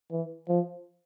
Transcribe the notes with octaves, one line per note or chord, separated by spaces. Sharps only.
E3
F3